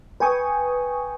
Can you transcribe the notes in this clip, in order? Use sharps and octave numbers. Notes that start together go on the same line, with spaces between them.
B4 G5 G#5 C#6 D#6